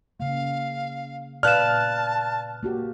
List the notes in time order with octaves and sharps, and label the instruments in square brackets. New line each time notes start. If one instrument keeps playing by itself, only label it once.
[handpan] C#3 A#3 [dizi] F5
[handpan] A#2 B4 [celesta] D5 F5 E7 [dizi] A5 [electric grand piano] F6 F#6
[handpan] A#3 F#4 G4